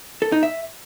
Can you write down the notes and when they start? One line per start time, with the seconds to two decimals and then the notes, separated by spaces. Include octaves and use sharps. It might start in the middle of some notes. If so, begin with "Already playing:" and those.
0.22 A4
0.32 D#4
0.43 E5